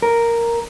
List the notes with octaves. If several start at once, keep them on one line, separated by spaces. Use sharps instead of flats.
A#4